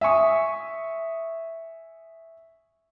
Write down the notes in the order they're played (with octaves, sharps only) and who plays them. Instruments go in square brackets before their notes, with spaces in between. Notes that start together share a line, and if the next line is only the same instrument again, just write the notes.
[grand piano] E5 G#5 C#6 D#6